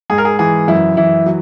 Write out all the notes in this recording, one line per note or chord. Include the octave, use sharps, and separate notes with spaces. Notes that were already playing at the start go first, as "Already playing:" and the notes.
G#2 G#4
A#4
G#4
E3 G#4
F#2 E4
E3 E4
F#3